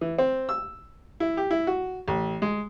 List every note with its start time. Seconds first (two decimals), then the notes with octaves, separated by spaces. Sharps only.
0.01 E3
0.18 C4
0.49 E6
1.20 E4
1.37 G4
1.51 E4
1.67 F#4
2.08 A1
2.42 G#3